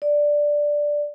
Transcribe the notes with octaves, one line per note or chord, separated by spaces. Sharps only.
D5